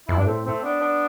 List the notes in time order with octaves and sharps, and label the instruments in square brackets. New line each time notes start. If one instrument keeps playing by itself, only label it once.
[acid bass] F2 [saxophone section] E4
[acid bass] G2 [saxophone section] D4
[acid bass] A2 [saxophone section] A3 C4
[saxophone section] A3 C4
B3 D4
B3 D4